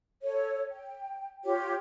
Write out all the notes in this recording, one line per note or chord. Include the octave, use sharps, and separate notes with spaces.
A4 C#5
G5
F4 G4 C#5